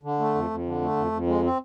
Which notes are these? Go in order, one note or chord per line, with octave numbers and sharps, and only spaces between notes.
D3
A3
F2
F2
D3
A3
F2
F2
G#3
C4